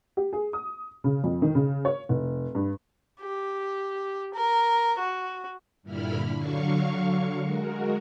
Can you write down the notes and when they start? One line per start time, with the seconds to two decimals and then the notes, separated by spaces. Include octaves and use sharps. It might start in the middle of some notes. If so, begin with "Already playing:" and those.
0.17 G4
0.33 G#4
0.53 D#6
1.04 C#3
1.24 F2
1.42 D#3
1.55 C#3
1.85 C#5
2.09 F1
2.55 G2
3.21 G4
4.34 A#4
4.99 F#4
5.83 G2 A#2 D3 E4 B5 F6
6.35 D3 F#3 F5 C#6
7.41 G#3 F#4 A#4